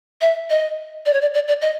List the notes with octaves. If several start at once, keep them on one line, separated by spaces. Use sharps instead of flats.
E5
D#5
D5
C#5
D5
D5
D5
D#5